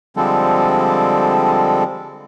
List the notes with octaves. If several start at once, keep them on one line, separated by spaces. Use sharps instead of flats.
D3 F3 G3 G#3 C4 A4